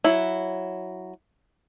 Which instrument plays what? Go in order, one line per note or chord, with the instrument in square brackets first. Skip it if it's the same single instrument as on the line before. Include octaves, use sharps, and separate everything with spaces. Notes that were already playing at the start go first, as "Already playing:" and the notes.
[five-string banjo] F#3 E4